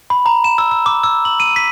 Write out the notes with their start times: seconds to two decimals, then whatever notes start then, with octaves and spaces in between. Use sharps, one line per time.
0.10 B5
0.26 A#5
0.44 E7
0.58 E6
0.71 E6
0.86 D6
1.03 E6
1.25 F#7
1.40 D#7
1.56 B6